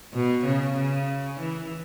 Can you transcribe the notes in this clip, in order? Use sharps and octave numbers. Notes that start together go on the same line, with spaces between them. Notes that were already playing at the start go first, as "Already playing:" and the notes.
B2
C#3
C#3
E3